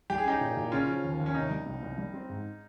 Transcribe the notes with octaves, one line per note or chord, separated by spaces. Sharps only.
G3 G4
G#4
C#4 D#4 G4
A#2
A#2
C#3 C#4 F4
F3
D#2
D#2
C#4
C3 D#4
G3
C2
C2
G3
C4
G#2